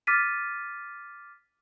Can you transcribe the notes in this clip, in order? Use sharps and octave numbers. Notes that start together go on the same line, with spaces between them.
D6 F6 A6 B6 D#7